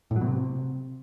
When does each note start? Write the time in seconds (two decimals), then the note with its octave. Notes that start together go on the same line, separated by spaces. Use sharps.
0.11 A2
0.16 F#3
0.21 B2
0.27 C3